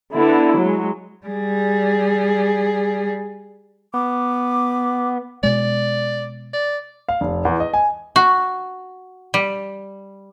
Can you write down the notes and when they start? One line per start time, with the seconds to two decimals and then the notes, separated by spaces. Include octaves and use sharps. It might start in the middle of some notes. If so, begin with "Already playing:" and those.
0.13 D3 B3 E4
0.60 F#3 G#3
1.27 G3 G#4
3.94 B3 D6
5.43 B2 G#3 D5
6.53 D5
7.09 F5
7.21 F1
7.45 E2
7.60 D#5
7.74 G#5
8.16 F#4
9.34 G3